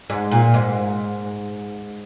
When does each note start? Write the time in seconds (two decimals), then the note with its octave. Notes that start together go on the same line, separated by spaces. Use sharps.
0.10 G#2
0.32 A#2
0.54 G#2